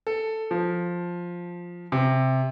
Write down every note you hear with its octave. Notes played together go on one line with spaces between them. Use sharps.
A4
F3
C3